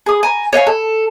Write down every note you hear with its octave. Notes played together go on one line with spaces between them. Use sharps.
G#4 D#6
G#5 A#5
C#5 D#5 F5 G#5
A4